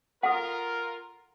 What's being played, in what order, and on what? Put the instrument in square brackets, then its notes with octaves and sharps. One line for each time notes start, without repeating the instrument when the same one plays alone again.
[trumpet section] F4 A#4 [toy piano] A4 F#5